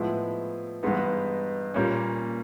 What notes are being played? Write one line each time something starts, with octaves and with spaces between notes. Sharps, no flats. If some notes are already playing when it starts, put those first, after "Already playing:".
Already playing: A2 F3 G#3 B3 E4
G2 E3 G#3 B3 D#4
A#2 G3 A#3 C#4